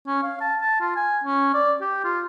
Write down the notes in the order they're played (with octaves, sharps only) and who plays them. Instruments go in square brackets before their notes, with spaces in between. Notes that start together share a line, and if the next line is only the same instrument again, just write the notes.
[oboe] C#4
F5
A5
A5
F4
G#5
C#4
D5
G4
F4